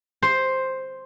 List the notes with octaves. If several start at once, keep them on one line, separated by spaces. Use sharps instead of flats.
C5